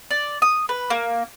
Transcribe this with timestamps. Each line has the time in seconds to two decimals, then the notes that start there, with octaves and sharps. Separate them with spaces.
0.11 D5
0.42 D#6
0.69 B4
0.90 A#3